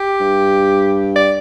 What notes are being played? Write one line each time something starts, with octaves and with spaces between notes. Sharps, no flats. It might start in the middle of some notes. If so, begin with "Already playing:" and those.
Already playing: G4
G2
D5